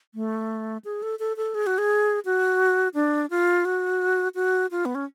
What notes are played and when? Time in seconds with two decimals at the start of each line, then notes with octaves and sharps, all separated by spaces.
0.15 A3
0.85 G#4
1.03 A4
1.19 A4
1.37 A4
1.54 G#4
1.67 F#4
1.78 G#4
2.25 F#4
2.94 D4
3.30 F4
3.65 F#4
4.35 F#4
4.71 F4
4.85 B3
4.95 C#4